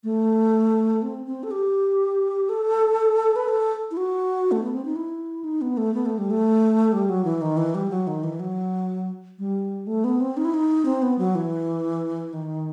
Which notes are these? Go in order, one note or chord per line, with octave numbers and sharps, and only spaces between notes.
A3
C4
C4
A4
G4
A4
B4
A4
E4
F#4
A3
B3
C4
D#4
E4
D#4
B3
A3
B3
A3
G3
A3
G3
F#3
E3
D#3
E3
G3
F#3
D#3
E3
F#3
G3
A3
B3
C4
D#4
E4
D#4
C4
B3
F#3
E3
D#3